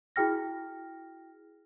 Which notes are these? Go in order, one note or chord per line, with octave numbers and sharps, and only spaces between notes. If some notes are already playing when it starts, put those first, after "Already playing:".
E4 F#4 G#4 G5 F6 A#6